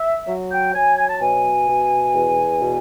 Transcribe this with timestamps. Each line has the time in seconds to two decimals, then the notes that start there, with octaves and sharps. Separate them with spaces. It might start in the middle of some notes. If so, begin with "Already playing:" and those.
Already playing: E5
0.28 F#3
0.51 G5
0.74 F#3 G#5
0.98 G#5
1.08 A5
1.20 B2 G#5
1.68 B2
2.14 E2
2.61 B2